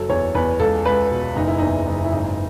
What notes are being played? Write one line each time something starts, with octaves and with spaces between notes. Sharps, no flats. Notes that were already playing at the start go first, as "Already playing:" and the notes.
Already playing: F#1 F#3 A4
E2 C#5
E2 B4
C#2 A4
C#2 B4
B2
F#1 D#4
E4
E2 D#4
F#1
E4
G#1 D#4